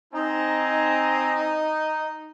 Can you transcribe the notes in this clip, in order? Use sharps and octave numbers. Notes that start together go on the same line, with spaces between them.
C4 D#4 G#5 A#5